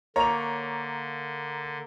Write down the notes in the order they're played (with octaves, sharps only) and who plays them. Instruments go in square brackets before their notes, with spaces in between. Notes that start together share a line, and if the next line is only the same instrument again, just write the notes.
[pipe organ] D3 [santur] A#3 [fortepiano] C#5 [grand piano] A#5 F7